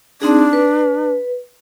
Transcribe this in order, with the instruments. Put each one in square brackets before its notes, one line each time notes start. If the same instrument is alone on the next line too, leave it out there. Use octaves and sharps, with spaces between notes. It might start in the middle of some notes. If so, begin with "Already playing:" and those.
[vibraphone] C4 D#4 G#4 [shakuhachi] D4
[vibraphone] B4